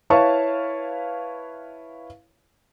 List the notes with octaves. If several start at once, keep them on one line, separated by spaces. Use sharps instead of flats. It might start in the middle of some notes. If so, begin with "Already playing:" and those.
E4 B4 C#5 F5 A5 C#6